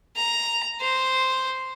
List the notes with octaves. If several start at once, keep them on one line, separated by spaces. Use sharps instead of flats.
A#5
C5